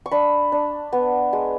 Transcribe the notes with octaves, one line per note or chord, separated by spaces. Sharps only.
C#6
D4 B5
D4
B3
G#3